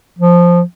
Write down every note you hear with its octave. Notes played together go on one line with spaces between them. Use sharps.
F3